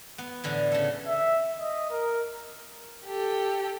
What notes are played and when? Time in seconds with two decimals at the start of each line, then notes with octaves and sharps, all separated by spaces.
0.18 B3
0.44 A2 D3 E3
0.72 C#3 A4
1.07 E5
1.59 D#5
1.91 A#4
3.05 G4 A4